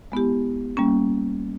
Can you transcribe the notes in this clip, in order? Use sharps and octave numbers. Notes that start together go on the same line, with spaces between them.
G#3 B3 E4 G4
G3 A#3 C#4